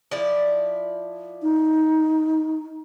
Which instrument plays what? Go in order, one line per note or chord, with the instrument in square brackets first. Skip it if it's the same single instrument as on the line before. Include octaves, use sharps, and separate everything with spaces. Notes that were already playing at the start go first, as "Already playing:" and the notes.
[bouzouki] F3 E4 D5
[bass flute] D#4